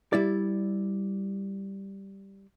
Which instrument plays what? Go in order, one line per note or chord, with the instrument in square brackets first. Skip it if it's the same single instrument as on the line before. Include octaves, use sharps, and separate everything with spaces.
[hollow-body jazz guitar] G3 E4 D5